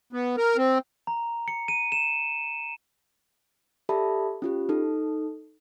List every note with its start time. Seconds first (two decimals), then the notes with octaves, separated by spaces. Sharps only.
0.13 B3
0.37 A#4
0.57 C4
1.07 A#5
1.48 C#7
1.68 D#7
1.92 E7
3.89 G4 A4 D5 E5 A5 B5
4.42 C#4 F4 G4
4.69 D#4 A4